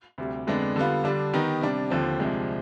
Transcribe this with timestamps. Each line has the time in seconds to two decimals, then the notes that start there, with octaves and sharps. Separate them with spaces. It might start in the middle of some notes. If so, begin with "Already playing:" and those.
0.18 D2 C3 G3
0.47 F2 D3 G#3 B3 D4
0.76 D3 G3 B3 F4
1.04 D3 G3 D4
1.33 D#3 B3 D#4 G4
1.61 C3 G3 D4
1.90 D#2 D3 F3 C4
2.19 C2 C3 F3 G#3 D4